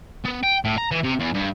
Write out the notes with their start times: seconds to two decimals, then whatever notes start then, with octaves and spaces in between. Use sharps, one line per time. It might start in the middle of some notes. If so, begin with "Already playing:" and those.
0.25 B3
0.43 G5
0.65 A2
0.78 A#5
0.92 E3
1.04 C3
1.20 E2
1.34 G2